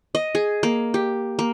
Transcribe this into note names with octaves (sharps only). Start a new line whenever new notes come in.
D#5
G#4
A#3
G4
A#3